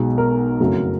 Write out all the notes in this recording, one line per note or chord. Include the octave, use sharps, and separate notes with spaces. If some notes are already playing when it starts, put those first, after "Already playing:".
Already playing: B1 B2 G#3
A#4
F#1 F2 C#3 F#3 A3